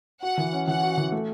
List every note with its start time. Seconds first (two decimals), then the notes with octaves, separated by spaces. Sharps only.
0.22 F#4 F#5
0.38 E3
0.53 C#4
0.67 E3 F#5
0.83 F#4
0.98 E3
1.12 A3